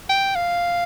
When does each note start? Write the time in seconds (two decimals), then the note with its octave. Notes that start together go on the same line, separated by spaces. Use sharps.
0.09 G5
0.35 F5